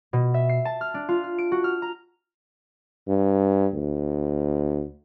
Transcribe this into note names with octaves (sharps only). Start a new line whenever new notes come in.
B2
E5
C7
A5
F6
D4
F4
F6
D7
F#4
F6
A#5
G2
D2